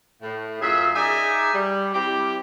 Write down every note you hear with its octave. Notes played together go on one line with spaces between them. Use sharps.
A2
F#2 F4 G#4 E5
D#4 G#4 D5 E5 G#5
G3
C4 E4 G4